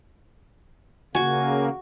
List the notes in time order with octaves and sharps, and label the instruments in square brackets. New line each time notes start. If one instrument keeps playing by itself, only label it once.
[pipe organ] C#3 A#3 [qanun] F#4 [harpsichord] G#5